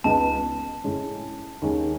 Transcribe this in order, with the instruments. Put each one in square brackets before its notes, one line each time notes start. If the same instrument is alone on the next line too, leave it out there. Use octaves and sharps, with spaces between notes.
[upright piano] C#2 C#3 G#3 B3 D#4 [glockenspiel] A5
[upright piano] A2 G#3 C#4
D#2 D#3 G#3 C#4 G#4